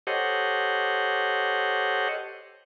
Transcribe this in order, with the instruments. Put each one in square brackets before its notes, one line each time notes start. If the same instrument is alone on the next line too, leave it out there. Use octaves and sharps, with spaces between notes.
[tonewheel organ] G4 A4 C5 C#5 D#5 F#5